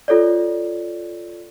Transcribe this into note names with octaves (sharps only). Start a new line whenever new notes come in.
F4 A4 C#5 D5